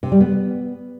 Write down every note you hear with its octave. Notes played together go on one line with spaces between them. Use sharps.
C3
G3
B3